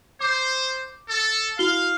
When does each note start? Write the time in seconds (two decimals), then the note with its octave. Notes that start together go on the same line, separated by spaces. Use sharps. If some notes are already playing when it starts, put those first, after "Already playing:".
0.21 C5 D6
1.10 A4
1.59 E4 F#4 F5 G7